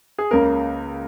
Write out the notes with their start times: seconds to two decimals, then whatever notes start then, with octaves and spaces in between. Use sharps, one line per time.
0.18 G#4
0.31 C#2 C#3 A#3 A#4